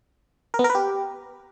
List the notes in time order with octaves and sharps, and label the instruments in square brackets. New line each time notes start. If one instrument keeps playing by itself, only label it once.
[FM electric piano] A#4
B3
A#4
B4
G4